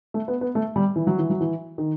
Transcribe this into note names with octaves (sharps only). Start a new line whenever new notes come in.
A3
B3
B3
A3
G3
E3
F#3
E3
F#3
E3
D#3